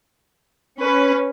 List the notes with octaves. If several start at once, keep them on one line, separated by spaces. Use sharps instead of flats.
C#4 B4